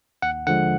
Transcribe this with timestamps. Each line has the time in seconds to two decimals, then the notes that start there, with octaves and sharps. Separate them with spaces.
0.22 D#2 F#5
0.47 D3 F3 G#3 F#5